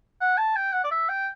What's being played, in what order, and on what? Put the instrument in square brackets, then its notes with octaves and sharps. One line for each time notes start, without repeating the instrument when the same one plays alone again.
[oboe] F#5
A5
G5
F#5
D5
E5
G5